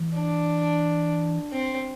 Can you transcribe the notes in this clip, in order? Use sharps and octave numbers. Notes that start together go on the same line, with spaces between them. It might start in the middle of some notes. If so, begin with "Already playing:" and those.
Already playing: E3
D4
C4